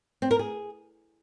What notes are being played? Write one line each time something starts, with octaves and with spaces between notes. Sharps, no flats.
C4
A#4
G#4